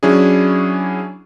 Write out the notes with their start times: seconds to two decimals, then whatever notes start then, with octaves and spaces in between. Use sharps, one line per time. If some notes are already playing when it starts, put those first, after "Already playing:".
0.03 F#3 C#4 D4 E4 G#4